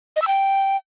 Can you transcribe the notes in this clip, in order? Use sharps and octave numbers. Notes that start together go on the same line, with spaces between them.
D#5
E6
G5